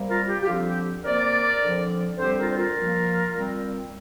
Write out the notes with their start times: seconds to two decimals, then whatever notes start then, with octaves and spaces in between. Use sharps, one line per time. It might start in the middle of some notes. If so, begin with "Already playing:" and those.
Already playing: C3 G3 A#3
0.09 F4 A#4
0.27 G4
0.42 G4
0.46 D3 F3 C4 F4
0.65 G4
1.04 C3 A#3 A#4 D5
1.61 D3 F3 C4
2.18 D3 G3 C4 G4 C5
2.38 F4 A#4
2.50 C5
2.57 F4 A#4
2.76 A#2 F3 A#3
3.34 A#2 G3 C4